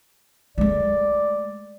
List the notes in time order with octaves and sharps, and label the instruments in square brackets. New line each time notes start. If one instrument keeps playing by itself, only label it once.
[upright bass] G#3 A3 [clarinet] D5